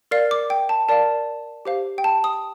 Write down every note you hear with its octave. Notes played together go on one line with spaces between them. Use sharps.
A#4 D5 F5 C7
D6
G5
A5
A#4 D5 F5 A5
G4 C5 F5
G5
A5
D#6